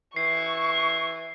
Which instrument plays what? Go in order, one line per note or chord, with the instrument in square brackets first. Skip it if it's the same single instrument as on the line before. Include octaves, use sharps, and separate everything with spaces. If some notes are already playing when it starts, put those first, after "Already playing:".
[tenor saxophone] E3 [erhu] C#6 [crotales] C7